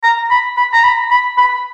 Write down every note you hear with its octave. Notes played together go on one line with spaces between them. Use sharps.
A#5
B5
B5
A#5
B5
B5
B5